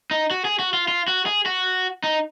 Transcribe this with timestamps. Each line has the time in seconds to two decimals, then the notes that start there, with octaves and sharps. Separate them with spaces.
0.11 D#4
0.31 F#4
0.45 G#4
0.59 F#4
0.73 F4
0.88 F4
1.08 F#4
1.26 G#4
1.46 F#4
2.04 D#4